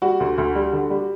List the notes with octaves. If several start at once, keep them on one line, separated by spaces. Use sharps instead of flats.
G3 F#4
D2
D2
G3
D3
G3